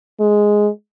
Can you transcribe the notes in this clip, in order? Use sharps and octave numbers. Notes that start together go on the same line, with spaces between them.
G#3